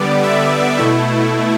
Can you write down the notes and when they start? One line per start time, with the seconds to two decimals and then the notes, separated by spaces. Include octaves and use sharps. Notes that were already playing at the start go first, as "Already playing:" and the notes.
Already playing: D3 G3 B3 D5
0.23 E5
0.78 B2 A3 E4